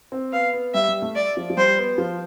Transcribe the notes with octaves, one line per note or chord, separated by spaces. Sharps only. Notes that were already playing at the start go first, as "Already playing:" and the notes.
C4
B3 F5
B3
G3 E5
G3
A3
D5
F3
F3
G3 C5
B3
F3